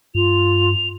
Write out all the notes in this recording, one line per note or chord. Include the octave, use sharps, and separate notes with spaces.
G2 F4 F7